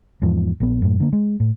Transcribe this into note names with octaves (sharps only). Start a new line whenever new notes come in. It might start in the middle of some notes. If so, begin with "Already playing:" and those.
E2 G#2 F3
A#1 B3
F#2 A2
D3 A#3
G#3
A2